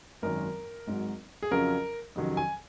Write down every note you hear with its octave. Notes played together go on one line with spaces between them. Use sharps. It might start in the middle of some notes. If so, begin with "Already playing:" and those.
G#1 F#2 D#3 A#4
G#1 G#2 F#3
G#4
F2 C#3 F#3 C#4 F4 A#4
F2 C3 D#3 F#3 C#4
G#5